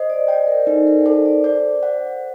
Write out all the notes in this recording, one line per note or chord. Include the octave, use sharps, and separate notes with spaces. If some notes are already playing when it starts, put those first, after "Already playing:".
Already playing: C5 D#5
D5
D5 G5
A#4
D#4 A4
A#4
A4 C5
D5
C5 D5
F#5